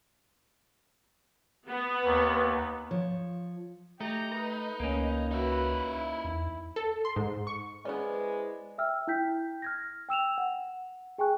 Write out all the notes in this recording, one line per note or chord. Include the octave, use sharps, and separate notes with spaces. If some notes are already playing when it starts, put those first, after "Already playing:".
B3
D#2
F3 C#5
A3 D#4 G4 A#5
B4
C#2 A#3 C#4
D#4 F#4 B4 E5
E4
E2
A4
C6
G#2
C#6
G#3 B3 C#4 E4 B4 C5 D5
E5 G5 E6 F6
E4 G5 G6 B6
F6 G#6 A#6
G5 E6 E7 F7
F#5
G#4 G5 G#5 C#6 F#6